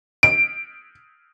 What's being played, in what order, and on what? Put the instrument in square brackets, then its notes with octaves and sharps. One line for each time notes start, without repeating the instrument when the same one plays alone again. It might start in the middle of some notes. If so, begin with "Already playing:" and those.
[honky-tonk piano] D7